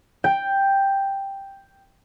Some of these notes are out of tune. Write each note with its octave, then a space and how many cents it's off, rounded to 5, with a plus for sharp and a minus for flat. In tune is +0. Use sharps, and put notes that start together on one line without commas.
G5 +5